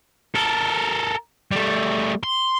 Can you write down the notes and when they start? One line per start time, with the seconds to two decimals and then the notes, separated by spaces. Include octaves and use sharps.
0.35 A4 A#4
1.51 G3 A3
2.23 C6